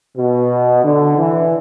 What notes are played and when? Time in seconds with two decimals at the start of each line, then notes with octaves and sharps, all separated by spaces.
0.17 B2
0.84 D3
1.18 E3